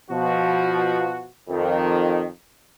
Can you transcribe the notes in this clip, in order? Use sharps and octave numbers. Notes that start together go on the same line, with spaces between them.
B2 F3 F#4
F2 D#3